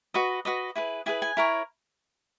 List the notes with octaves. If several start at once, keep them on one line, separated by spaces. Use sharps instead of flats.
F#4 B4 D#5
F#4 B4 D#5
E4 G#4 B4
E4 G#4 B4 G#5
G#5
E4 A#4 C#5